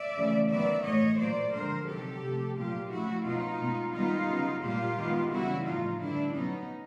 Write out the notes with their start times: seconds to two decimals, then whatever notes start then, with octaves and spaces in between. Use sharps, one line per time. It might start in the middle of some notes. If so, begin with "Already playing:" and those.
Already playing: D5 E5
0.16 C#3 E3 A3
0.50 D#3 F#3 B3 D5 E5
0.85 A2 E3 A3 C#5 D#5
1.19 A#2 F#3 A#3 C5 D5
1.53 D3 F3 G#3 A#4 C5
1.87 C3 D#3 F#3 G4 A4
2.22 C3 F3 A3
2.57 A#2 F#3 A3 F4 G4
2.91 C#3 F3 A3 E4 F#4
3.25 B2 F#3 B3 D#4 F4
3.61 B2 G#3 B3
3.94 D#3 G3 B3 D#4 F4
4.29 C#3 F#3 B3
4.63 A#2 G3 A#3 F4 G4
4.98 D#3 G#3 B3
5.32 C#3 E3 G3 B3 E4 F#4
5.66 A2 F3 A3 D#4 F4
6.00 D3 G3 B3 D4 E4
6.35 B2 F#3 B3 C#4 D#4